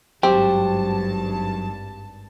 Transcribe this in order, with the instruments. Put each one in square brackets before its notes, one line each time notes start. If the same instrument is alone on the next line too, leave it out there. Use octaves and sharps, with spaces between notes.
[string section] G#1 G2 A5 [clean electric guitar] F#3 C5 [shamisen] C4 [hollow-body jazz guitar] G4